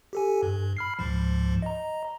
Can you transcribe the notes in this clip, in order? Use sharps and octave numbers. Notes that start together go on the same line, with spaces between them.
G4 A4 G#5
G2
B5 F6 C7
C#2 G#2 F3
D#5 A#5